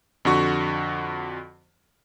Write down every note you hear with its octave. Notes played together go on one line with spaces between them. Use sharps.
F2 D3 F#4 C#6